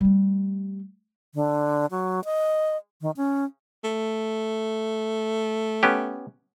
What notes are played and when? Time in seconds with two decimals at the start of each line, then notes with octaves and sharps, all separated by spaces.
0.01 G3 A3
1.35 D3
1.91 F#3
2.24 D#5
3.01 D#3
3.17 C#4
3.84 A3
5.83 B3 C#4 G4